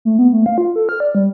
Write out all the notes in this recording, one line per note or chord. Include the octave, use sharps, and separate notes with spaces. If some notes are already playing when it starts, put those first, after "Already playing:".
A3
B3
A3
F5
F4
A4
F6
D5
G3